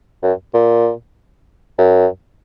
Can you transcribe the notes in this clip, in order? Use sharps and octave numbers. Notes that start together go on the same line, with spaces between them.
F#2
A#2
F#2